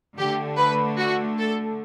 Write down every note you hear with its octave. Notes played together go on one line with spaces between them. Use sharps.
D3 A3 G4
B4
F#4
A4